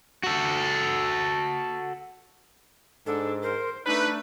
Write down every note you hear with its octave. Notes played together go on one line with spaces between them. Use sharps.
F#4 A4
G#2 D4 A4
A#4 C5
A3 D4 D#4 B4